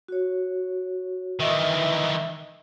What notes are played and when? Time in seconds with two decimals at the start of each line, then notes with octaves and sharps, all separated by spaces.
0.08 F#4 C#5
1.40 D#3 E3 D#5 E5